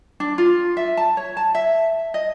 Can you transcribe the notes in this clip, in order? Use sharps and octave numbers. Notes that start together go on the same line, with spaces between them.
D4
F4
E5
A5
C#5
A5
E5
D#5